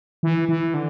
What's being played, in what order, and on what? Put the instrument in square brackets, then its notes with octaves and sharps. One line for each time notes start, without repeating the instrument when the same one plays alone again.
[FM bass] E3
E3
D3